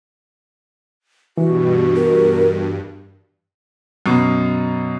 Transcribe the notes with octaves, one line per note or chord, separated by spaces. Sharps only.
G2 B2 E3 F#4
G2 A#4
F#2 B2